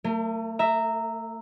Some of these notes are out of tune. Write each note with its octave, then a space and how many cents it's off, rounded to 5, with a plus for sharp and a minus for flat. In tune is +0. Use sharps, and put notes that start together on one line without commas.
A3 +35 A#4 -25
E5 +0 A#5 -15